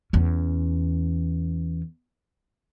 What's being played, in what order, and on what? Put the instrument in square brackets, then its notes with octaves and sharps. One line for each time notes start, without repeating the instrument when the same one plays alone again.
[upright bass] E2 C#4